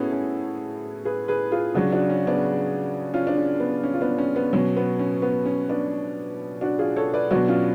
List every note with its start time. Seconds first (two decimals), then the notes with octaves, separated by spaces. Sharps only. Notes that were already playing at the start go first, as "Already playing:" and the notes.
Already playing: A2 B3 C#4 F#4 G#4 A4
0.13 C#4
1.05 G#4 B4
1.28 G#4 B4
1.52 F4 G#4
1.74 C#3 F#3 D4 F#4
1.92 D4 F#4
2.10 C#4
2.27 B3 D4
3.14 C#4 F4
3.27 D4
3.37 C#4
3.60 B3
3.84 C#4
3.94 F4
4.01 B3 D4
4.18 C#4
4.36 B3
4.53 B2 F#3 C#4
4.77 B3
4.99 C#4
5.22 B3
5.46 C#4
5.69 B3 D4
6.61 D4 F#4
6.79 F4 G#4
6.96 A4 C#5
7.13 B4 D5
7.31 B2 F#3 D4 F#4
7.48 C#4 F4